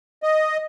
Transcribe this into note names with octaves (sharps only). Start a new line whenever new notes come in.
D#5